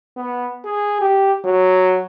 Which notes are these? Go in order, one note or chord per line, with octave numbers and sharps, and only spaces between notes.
B3
G#4
G4
F#3